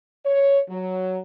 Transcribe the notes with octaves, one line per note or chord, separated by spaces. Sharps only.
C#5
F#3